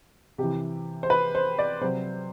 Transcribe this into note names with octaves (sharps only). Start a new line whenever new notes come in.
C3 E3 G4
C5
B4
C5
D5
C3 F#3 C5